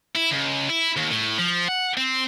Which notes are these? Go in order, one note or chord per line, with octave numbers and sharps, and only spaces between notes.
E4
C#2
E4
D#2
A2
F3
F#5
C4